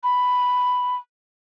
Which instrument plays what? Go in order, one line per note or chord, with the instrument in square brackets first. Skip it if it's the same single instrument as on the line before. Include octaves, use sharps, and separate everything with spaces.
[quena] B5